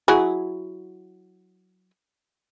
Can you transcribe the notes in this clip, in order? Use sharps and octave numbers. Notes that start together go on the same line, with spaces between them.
F#3 E4 G#4